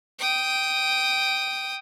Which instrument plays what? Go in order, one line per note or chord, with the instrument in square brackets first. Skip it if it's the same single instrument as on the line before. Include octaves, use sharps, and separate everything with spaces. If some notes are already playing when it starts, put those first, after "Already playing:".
[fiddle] G5 D#6